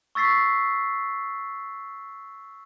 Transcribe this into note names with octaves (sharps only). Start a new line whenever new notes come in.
C#6 E6 A6 B6 C7